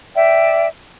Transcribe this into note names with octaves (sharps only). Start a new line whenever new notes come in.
D5 E5 G5